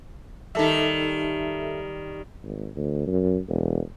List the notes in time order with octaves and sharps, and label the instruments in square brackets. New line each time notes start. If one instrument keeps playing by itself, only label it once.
[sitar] D#3 G3 [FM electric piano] D#4 A4 E5
[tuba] G#1
D2
F#2
E1